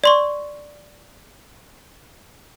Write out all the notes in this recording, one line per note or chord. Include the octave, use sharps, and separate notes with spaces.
D5 C6 C#6